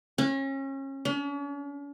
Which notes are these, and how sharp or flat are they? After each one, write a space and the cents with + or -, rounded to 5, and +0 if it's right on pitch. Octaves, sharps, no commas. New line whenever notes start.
C#4 -30
C#4 +45